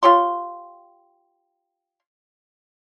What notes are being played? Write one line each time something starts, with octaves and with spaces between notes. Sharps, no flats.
F4 G4 C#5 C6